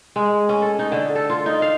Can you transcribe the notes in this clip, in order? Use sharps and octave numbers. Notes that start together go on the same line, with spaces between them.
G#3
C#4
A4
D#4
D3
A4
F4
D#4
F5